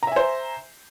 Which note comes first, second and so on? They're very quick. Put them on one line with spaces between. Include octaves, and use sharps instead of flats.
A#5 E5 G#5 C5